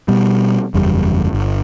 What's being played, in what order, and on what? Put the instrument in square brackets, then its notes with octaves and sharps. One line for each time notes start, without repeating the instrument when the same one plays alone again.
[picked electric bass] B2 G3
F#1 E2 G3
G1